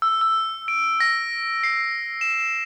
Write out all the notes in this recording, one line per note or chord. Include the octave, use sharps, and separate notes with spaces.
E6
E6
D7
A#6
C7
E7